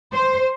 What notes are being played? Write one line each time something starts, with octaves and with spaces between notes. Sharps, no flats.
C5